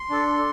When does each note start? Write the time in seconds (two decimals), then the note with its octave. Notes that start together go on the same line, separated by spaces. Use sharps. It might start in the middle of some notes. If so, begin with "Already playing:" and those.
Already playing: C6
0.10 D4 A4